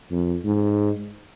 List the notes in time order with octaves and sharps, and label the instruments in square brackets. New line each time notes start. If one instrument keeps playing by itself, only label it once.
[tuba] F2
G#2